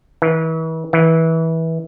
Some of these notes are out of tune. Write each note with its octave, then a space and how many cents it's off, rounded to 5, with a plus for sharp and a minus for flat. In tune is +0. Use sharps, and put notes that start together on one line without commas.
E3 -35
E3 -20